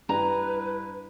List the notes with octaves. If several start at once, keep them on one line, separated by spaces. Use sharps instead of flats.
G2 E4 B4 A#5